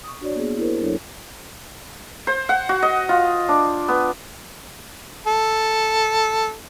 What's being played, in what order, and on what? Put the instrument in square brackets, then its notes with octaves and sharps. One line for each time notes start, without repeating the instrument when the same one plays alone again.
[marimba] C#6 D#6
D4 F#4 C#5 D5
A#3 B3 G#4
E4 G4 G#4 A#4 C5
E2 F#3 D4 E4 A4 C#5
[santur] C5
F#5
F#4
D#5
F4
D4
B3
[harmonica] A4